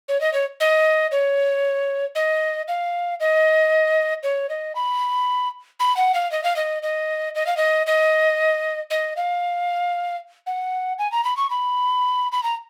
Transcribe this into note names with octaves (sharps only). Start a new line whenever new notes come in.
C#5
D#5
C#5
D#5
C#5
D#5
F5
D#5
C#5
D#5
B5
B5
F#5
F5
D#5
F5
D#5
D#5
D#5
F5
D#5
D#5
D#5
F5
F#5
G#5
A#5
B5
C#6
B5
B5
A#5